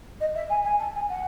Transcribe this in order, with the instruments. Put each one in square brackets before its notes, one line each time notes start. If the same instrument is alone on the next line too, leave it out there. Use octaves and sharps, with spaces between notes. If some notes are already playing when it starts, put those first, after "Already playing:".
[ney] D#5
E5
G#5
G#5
A5
G#5
F#5